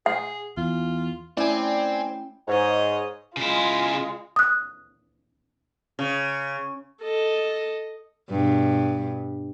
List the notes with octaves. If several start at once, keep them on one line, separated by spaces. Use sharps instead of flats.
G#4 F#5
E2 F4
A3 C4 C#4 E4 D5 G5 G#5
G#2 C#5 D#5
C#3 G#3 E4 F4
D#6 F#6
C#3
A4 D#5
G2 B2